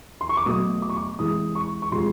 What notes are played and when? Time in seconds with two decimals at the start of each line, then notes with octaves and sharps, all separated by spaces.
0.21 C6
0.29 C#6
0.37 D6
0.46 B2 F#3 A3 D#6
0.82 D6
0.90 C#6
0.97 D6
1.19 C3 E3 G#3 D#6
1.55 C#6
1.82 C#6
1.92 C3 F3 G#3 C6